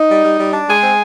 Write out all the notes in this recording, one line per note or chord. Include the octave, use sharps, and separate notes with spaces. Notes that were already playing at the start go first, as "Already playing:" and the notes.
Already playing: D#4
G3
G3
G3
D4
G#3 G#4
C4